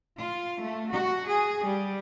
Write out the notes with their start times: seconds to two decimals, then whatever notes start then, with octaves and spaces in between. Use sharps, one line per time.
0.18 F4
0.59 A3
0.93 F#4
1.29 G#4
1.65 G3